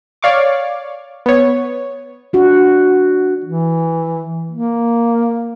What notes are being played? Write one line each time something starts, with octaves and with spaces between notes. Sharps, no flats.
C#5 D5 F5 C#6 D6
B3 C#5
D4 F#4
E3
A#3